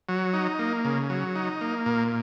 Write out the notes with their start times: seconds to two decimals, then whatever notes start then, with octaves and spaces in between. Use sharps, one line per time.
0.09 F#3
0.34 D#4
0.59 A#3
0.85 C#3
1.10 F#3
1.36 D#4
1.61 A#3
1.86 A#2